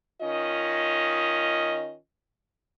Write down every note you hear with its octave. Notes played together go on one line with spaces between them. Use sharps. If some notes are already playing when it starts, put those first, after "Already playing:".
D#3 C#4 F4 D#5